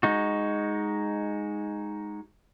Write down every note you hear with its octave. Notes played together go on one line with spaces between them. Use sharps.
G#3 D#4 F#4